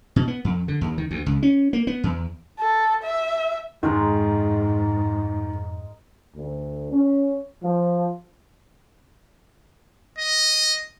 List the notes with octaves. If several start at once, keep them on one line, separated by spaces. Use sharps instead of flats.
B2
B3
F2
D3
D#2
D#3
D2
C#2
C#4
A#3
B3
E2
A4
E5
F2 G#2 D#3 G#3 A#4 D#5
D2
C#4
F3
D#5